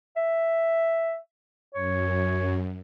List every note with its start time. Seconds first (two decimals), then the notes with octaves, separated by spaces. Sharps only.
0.16 E5
1.75 F#2 C#5